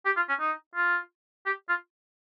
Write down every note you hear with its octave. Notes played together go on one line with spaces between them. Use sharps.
G4
F4
C#4
D#4
F4
G4
F4